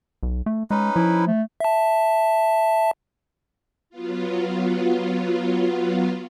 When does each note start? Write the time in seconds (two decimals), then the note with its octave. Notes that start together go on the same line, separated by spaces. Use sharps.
0.23 B1
0.46 A3
0.71 G#3 C#4 D#4 B4
0.96 F3 E4
1.27 A3
1.60 E5 A5
3.90 F#3 B3 F4